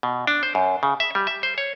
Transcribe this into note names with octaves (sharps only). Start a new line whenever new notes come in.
B2
D4
C5
F#2
C#3
E5
G3
E5
C5
C#5